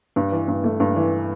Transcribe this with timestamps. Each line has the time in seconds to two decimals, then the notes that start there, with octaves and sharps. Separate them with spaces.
0.16 G2
0.32 E3
0.48 G2
0.64 A3
0.80 G2
0.96 E3